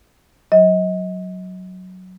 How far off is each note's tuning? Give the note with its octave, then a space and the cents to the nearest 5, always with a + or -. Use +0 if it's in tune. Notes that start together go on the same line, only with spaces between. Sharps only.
F#3 +0 D#5 +30